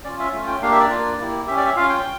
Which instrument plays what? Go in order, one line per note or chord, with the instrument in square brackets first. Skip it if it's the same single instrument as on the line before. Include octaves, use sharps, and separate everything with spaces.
[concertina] C#4 F4 D5
E5
A3 C#4 F4
G5
A#3 D4 G4 F5
E5
D5
A#3 D4 F4
A#3 E4 G4
C#4 G4 E5
D5
E5
C#4 F4 F5
G5